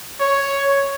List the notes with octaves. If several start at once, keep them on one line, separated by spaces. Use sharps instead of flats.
C#5